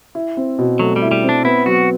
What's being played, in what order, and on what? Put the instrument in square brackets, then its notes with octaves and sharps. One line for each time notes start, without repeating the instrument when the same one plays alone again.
[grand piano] E4
C4
B2
[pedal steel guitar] F#3 [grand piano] A3
[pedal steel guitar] G3
[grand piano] E4
[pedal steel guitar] G3
[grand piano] C4
[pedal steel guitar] D4
[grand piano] B3 [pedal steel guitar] E4
[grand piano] F#3 [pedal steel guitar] F#4